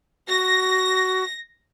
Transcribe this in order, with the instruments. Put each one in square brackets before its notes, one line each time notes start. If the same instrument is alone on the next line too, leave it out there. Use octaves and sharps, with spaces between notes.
[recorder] F#4 [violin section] A#6